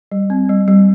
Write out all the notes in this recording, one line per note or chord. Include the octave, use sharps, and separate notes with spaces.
G3
C4
G3
G3